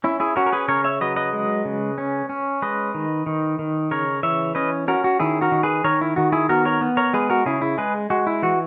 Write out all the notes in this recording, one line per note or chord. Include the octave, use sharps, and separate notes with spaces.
C#4 E4
E4 G#4
C#4 F#4 A#4
A#4
G#4 B4
C#3 A#4 C#5
C#5 E5
F#3 B4 D#5
B4 D#5
G#3
C#3
C#4
C#4
G#3 B4 D#5
D#3
D#3
D#3
C#3 A#4 C#5
E3 C#5 E5
C#4 B4 D#5
C#4 F#4 A#4
F#4
D#3 E4 G#4
F#4 A#4
D#3
G#4 B4
D#3 A#4 C#5
E4
D#3 F#4
E4 G#4
B3 F#4 A#4
A#4 C#5
B3
A#4 C#5
G#3 G#4 B4
F#4 A#4
C#3 E4 G#4
E4
G#3 G#4 B4
G#3 F#4
E4
E3 F#4